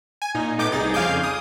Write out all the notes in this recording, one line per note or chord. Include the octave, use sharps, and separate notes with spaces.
G#5
A#2 D#4
A2 B3 D#4 D6 G6
C2 D#4 G#4 A6
F2 C#3 F5 G#5 D6 G6
D#6